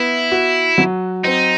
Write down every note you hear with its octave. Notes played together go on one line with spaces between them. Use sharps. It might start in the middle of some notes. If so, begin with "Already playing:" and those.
Already playing: B3 E4
F#4
F#3
C4 D#4